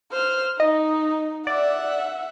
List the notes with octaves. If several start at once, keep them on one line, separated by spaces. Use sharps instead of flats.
C5 F6
D#4 D#5
D5 E5 F#5